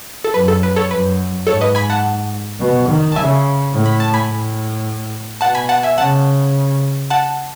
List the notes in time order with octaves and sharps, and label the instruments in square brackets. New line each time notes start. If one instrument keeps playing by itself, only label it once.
[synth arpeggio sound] A4
[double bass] F#2 [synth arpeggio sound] B4
[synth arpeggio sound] A4
B4
A4 C#5
[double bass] F#2 [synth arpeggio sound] B4
[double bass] G#2 [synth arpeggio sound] A4 C#5
[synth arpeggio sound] B4 D#5
G#5 B5
F#5 A5
[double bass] B2
D#3
[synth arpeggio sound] A5
[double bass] C#3 [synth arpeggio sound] E5 G#5
[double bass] A2
[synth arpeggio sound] B5
A5
G#5 B5
[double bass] A2
[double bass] B2 [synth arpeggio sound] F#5 A5
[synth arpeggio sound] G#5 B5
F#5 A5
E5 G#5
[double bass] C#3 [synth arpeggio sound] F#5 A5
[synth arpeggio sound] F#5 A5